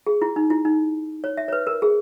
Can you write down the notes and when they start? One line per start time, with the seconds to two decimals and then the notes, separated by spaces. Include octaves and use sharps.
0.07 G#4
0.22 E4
0.36 D#4
0.50 E4
0.65 D#4
1.24 C#5
1.37 E5
1.48 C#5
1.53 B4
1.67 A#4
1.82 G#4